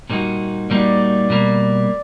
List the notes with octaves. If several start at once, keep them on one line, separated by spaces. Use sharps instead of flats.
A#2 G3 A#3 D#4 F#4
A#2 G3 A#3 D#4 F#4 D5
B2 G3 A#3